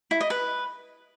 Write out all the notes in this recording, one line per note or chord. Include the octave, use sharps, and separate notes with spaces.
E4
D#5
B4